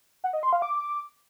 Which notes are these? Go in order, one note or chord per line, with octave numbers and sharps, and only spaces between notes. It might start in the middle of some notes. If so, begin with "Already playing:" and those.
F#5
D#5
C6
F5
D6